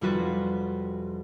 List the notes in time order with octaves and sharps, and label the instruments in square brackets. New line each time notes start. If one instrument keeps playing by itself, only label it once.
[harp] F1 G3 F4 F#4 B4